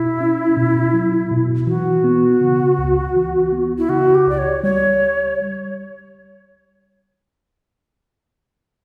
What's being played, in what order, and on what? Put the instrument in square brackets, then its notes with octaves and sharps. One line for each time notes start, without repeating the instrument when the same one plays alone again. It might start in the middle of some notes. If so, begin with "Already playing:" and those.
Already playing: [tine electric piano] B2 [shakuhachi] E4
[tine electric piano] C#4
B2
F#3
B2
[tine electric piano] E3 [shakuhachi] F#4
[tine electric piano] B3
C#3
C#2
E3
B3
[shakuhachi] E4
[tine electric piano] C#3 [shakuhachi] F#4
[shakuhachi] G4
[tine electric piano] C#2 [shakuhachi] D5
[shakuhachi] C#5
[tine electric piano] G3 [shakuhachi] C#5